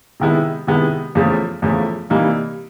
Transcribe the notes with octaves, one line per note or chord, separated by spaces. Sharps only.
C3 D#3 G#3 B3 E4
C3 D#3 G#3 B3 E4
E2 C#3 F3 A3
E2 C#3 F3 A3
C3 E3 G3 A#3 D#4